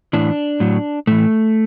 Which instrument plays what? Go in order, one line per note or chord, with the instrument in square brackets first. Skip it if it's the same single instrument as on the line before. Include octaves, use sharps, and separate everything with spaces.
[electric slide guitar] A2 E3 D4
A2 F#3
A2 E3 A3